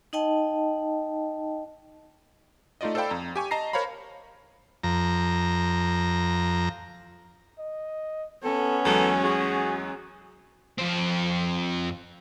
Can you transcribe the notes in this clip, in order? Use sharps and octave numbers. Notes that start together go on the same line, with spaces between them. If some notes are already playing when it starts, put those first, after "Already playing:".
D#4 D#5 G5 A5
A3 D#4 F4 D5 D#5
A4 C5 D5 F5 G5 B5
F2 A#5
G4 G#5 C#6
D#5 A5 A#5 A#6 C7
A#4 C5 C#5 F5 A#5 B5
F2 A#5
D#5
B3 C#4 A4
E2 F#3 G#3 A4
F#4 G#4
F2 C4